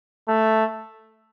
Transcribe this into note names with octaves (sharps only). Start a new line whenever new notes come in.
A3